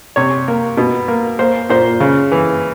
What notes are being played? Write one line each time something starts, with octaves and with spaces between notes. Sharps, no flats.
C3 C#5
A#3
B2
A#3
A#3 C5
A#2 C5
C#3
E3